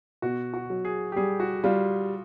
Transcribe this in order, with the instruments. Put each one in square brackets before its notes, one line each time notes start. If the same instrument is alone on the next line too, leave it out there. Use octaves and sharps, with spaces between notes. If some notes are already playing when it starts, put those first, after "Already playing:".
[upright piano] B2 [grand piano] F#4
[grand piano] F#4
[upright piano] F#3
[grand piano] G#4
G4
[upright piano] G3 [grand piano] G#4
[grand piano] F#4
[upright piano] G3 [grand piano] F4